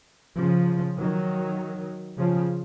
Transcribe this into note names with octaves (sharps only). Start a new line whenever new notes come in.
C#3 F3
D#3 F#3
C#3 F3